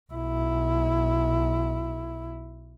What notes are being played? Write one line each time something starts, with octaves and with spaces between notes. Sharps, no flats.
B1 E4